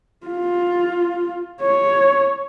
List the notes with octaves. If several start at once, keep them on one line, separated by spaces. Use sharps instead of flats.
F4
C#5